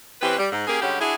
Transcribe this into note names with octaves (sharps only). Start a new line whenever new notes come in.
E3 C4 C#4 G4 B4
G3
G#2
A#3 C#4 G4 G#4
D3 G3 G#3 C#4 F#4 G4
D4 E4 F#4 G#4